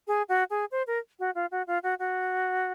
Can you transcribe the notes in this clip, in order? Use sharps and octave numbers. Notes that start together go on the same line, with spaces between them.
G#4
F#4
G#4
C5
A#4
F#4
F4
F#4
F4
F#4
F#4